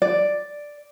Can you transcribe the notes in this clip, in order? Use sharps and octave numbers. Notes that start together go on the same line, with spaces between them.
D5